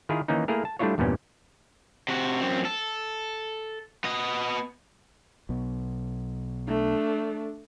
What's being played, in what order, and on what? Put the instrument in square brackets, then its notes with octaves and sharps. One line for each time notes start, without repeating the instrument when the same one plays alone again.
[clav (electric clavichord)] D#3 E4 F4 G#4 A#4
D#3 E3 A#3 C#4 D#4
A3 A#3 E4 G#4 A#4
A5
G3 A3 D4 E4 F4 C#5
E2 G2 A#2 G3 B3 C#4
[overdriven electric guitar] C3 F#4
F#2 C4
A4
B3 D#5
[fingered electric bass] B1 B2 B3
[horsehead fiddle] A3 D4